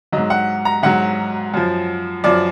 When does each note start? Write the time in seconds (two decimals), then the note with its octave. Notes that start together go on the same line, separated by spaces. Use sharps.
0.13 G#2 F#3 D#5
0.30 F#5
0.65 A#5
0.83 G#2 F#3 F#5
1.54 F#2 F3
2.24 F#2 F3 D5